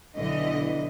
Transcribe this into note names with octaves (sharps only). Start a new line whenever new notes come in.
B1 D3 E3 D#5